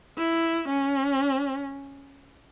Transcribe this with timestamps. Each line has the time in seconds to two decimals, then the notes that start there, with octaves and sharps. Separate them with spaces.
0.18 E4
0.69 C#4